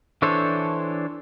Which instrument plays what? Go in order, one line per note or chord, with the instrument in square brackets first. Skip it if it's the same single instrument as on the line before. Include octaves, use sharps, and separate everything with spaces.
[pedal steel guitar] E3 D4 A4 C5 C#5